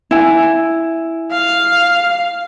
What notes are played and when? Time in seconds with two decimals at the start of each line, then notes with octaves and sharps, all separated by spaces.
0.11 E4 G#5
1.32 F5